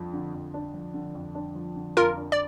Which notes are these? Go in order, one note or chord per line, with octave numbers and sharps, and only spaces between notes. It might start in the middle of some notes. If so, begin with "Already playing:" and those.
Already playing: F2 F3 D4
D3
F2
D4
F3
D3
F2
D4
F3
D3
F2 F4 A#4
D4
D5